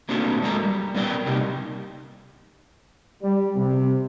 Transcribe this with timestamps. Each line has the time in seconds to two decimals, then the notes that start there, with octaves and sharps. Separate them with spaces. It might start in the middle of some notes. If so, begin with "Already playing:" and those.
0.09 A3 A#3 C4 D4 F#4 A4
0.41 F#2 G#3 A3 A#4 A#5
0.63 G3
0.95 B3 C#4 A#4 D5 G5
1.26 C3 G3 A#3 D#4
3.23 G3
3.55 C3